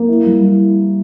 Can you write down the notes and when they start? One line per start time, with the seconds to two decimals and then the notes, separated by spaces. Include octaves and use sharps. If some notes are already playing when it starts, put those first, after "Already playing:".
Already playing: A#3
0.08 E4
0.26 G3
0.44 E4